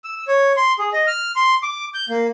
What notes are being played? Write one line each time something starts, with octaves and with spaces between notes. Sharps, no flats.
E6
C#5
C6
G#4
D#5
F6
C6
D6
G6
A#3